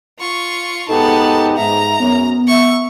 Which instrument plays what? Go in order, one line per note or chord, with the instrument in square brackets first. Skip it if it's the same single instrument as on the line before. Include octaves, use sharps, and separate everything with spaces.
[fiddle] F4 C#6
[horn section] G#2 D#4 G4 [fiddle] B3 A5 [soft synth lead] A4
[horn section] G#2 [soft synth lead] E5 [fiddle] A#5
[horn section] F#2 [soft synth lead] B3
[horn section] E5 [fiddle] C#6